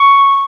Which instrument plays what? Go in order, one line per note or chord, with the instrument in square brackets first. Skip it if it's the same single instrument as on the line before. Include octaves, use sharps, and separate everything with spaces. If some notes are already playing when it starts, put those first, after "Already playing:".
Already playing: [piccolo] C#6